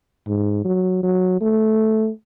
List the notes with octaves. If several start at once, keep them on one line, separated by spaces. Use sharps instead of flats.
G#2
F#3
F#3
A3